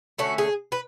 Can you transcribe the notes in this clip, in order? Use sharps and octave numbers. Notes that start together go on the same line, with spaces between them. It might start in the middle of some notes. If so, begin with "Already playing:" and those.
D3 A3 C#4 F#4
G#4
B4